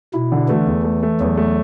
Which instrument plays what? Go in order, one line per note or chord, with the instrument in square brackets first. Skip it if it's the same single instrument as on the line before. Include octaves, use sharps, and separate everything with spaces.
[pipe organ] B2 [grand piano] E4
[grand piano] D3
[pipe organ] E3 [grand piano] A3
[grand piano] E2
A3
A3
[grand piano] E2 [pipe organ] F#3
[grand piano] A3